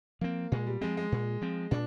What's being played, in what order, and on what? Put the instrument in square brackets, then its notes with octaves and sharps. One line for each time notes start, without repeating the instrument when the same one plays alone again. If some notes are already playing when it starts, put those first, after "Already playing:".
[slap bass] F3 C4 [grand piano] A#3
[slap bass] A#2 [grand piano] G#3
[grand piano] G3
[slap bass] F3 C4 [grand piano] G#3
[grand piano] G#3
[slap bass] A#2
F3 C4
[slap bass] A#2 [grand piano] D4